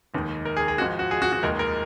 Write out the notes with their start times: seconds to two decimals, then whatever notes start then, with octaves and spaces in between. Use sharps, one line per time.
0.14 F1 D#2 D#3 G#3
0.45 A#4
0.57 G#4
0.68 G#4
0.78 G#1 G#2 F3 G#3 F#4
0.99 F#4
1.11 G#4
1.22 F#4
1.32 F#4
1.43 F1 D#2 D#3 G#3 A#4
1.59 A#4